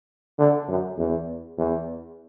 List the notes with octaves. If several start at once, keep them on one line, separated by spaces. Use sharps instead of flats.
D3
F#2
E2
E2